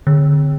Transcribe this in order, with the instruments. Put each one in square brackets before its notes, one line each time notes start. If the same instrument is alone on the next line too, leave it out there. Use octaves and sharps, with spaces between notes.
[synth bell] D3